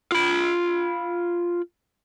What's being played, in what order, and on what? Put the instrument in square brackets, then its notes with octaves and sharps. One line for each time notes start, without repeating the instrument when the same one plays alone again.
[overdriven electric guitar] F4 B5